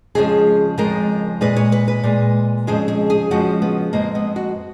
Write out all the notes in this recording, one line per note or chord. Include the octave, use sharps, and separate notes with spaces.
F2 C#3 F3 G#3 G#4
F2 C#3 F3 G#3 A#4
A#2 G#3 B4
C#5
B4
B4
A#2 G#3
F2 C#3 F3 G#3 G#4
G#4
G#4
F2 C#3 F3 G#3 F#4
B3
F2 F3 G#3 A#3
B3
F#4